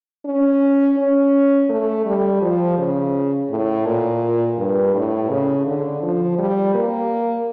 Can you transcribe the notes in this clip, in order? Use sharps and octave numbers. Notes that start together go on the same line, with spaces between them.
C#4
C#4
A3
G3
F3
C#3
A2
A#2
G2
A2
C#3
D3
F3
G3
A#3